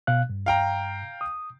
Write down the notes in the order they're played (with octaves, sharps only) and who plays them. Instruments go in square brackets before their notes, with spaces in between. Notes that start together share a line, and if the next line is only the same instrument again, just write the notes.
[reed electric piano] B2 F5 F#6
G2
[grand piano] F5 G5 A#5
[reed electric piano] D#6